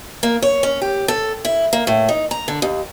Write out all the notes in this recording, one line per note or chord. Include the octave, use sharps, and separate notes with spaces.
A#3
C#5
C#4
G4
A4
E4
A#3
A2
D#4
A#5
D3
D#2